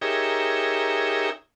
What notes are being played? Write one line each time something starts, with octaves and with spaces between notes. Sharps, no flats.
D#4 G4 G#4 A#4 C#5 E5